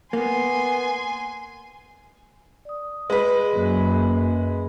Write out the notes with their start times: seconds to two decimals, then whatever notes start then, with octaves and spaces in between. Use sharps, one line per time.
0.13 A#3 B3 G#5 C6
2.65 D5 D#6
3.10 G#3 B4
3.55 F#2 A#3